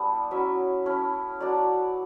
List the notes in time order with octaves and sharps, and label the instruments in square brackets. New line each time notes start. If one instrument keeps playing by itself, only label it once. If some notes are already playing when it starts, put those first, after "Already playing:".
Already playing: [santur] G3 B3 D4 E4 A4 B4
F#3 C#4 E4 E5
A3 C#4 E4
F#3 A3 D4 D5